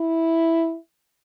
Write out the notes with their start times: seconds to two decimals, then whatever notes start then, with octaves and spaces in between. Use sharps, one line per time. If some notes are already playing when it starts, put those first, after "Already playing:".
Already playing: E4